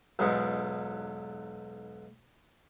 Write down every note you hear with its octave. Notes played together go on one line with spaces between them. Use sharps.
B1 E2 G#2